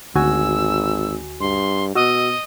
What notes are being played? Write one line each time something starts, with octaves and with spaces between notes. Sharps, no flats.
G#1 D2 F#4 G#5 E6
G2 C6
B2 F#4 D#5 E6